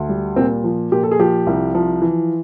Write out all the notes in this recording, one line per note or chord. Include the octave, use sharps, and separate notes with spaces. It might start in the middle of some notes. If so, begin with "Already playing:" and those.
Already playing: D2
G3
A#2 C4
F3
A#2 G4
A4
G#4
F3 G4
C2
F3
E3